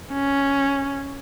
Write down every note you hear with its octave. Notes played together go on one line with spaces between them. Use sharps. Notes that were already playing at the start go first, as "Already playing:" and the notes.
C#4